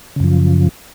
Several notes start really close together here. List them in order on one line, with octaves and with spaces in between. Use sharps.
C#3 F#2 F3